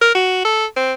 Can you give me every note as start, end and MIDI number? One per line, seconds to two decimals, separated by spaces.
0.01 0.10 70
0.15 0.43 66
0.45 0.65 69
0.76 0.93 60